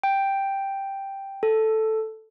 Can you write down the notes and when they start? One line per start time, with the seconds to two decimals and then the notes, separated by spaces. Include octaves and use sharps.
0.04 G5
1.43 A4